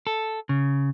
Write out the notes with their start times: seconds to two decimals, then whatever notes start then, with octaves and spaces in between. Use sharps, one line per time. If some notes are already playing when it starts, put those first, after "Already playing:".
0.07 A4
0.49 C#3